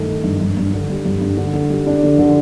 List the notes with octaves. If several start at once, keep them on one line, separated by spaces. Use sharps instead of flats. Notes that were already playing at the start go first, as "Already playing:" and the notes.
Already playing: G2 D#3 A3
D#4
G2
G2
G2
D3
G3
G2
G2
D3
D3
G3
D4
D3
D3